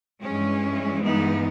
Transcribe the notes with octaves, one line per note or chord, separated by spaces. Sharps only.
G2 E3 G#3 C#4
B3 D#4